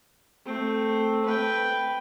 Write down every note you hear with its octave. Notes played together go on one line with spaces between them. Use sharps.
A3 C4
B4 G5